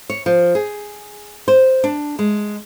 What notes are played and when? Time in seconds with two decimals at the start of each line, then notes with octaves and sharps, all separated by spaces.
0.10 C#5
0.26 F3
0.55 G#4
1.48 C5
1.84 D4
2.19 G#3